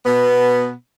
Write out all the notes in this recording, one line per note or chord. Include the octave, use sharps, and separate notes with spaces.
B2 B3